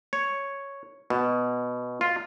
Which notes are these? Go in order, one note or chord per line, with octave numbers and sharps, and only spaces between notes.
C#5
B2
F4